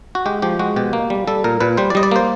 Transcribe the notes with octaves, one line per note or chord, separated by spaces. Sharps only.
F#4
G#3 G4
F3 G4
G#3 F#4
B2 G4
A#3
G3
G3 A4
A#2 A#4
A#2 B4
G3 C5
D5
G3 D#5
D5
A#3 C5